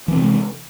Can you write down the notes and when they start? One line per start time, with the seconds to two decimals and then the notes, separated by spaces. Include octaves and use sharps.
0.08 E3
0.12 C4
0.16 C3
0.21 G#3